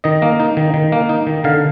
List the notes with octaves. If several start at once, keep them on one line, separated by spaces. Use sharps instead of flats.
D#3 D#5
A#3
D#4
D#3
D#3
A#3
D#4
D#3
D3 F5